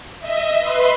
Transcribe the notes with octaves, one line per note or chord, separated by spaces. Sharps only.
D#5 E5
B4 C6